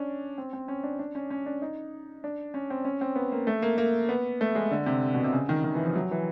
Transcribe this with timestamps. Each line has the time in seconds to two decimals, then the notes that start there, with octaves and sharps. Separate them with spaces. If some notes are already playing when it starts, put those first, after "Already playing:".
Already playing: C#4 D4
0.38 C4
0.53 C4
0.68 C#4
0.83 D4
0.99 D4
1.15 C#4
1.30 C#4
1.46 D4
1.62 D#4
2.24 D4
2.54 C#4
2.70 C4
2.85 C#4
3.01 C4
3.16 B3
3.32 A#3
3.47 A3
3.62 A#3
3.78 A#3
4.09 B3
4.41 A3
4.55 G#3
4.71 D3
4.86 C3
5.14 B2
5.24 C3
5.33 C#3
5.49 D#3
5.64 D#3
5.75 E3
5.85 F3
5.95 F#3
6.11 E3